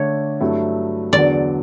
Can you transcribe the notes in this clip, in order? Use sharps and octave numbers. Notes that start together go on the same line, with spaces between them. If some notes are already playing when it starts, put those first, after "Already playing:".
Already playing: D3 A3 D4 C#5
G2 F#3 A3 E4
E2 D3 F#3 D5